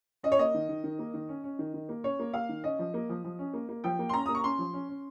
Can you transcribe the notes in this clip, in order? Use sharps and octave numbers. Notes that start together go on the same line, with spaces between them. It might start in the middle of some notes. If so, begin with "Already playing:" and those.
C#4 D#5
C#5
A#3 D#5
D#3
D#3
D#3
A#3
D#3
C#4
C#4
D#3
D#3
A#3
C#4 C#5
A#3
A#3 F5
D#3
C#4 D#5
F3
A#3
F3
F3
C#4
A#3
A#3
F3 G5
A#3
C6
C#4 A#5
A#3 D#6
C#6
C#4 C6
F3
C#4
C#4